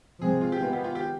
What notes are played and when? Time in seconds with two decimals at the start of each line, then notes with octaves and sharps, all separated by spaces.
0.20 C3 F3 G#3 C4 G#4
0.41 F4
0.52 G4
0.60 D#3 G#3 B3 F4
0.73 G4
0.84 F4
0.95 G4